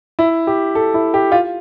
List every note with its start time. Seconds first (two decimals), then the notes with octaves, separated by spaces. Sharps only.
0.19 E4
0.47 G4
0.75 A4
0.94 E4
1.14 G4
1.32 F4